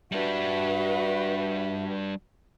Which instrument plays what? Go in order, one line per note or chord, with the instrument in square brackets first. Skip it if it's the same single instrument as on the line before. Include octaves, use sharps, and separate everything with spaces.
[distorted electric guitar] G3 D4 [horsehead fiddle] F#4 B4 [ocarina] E5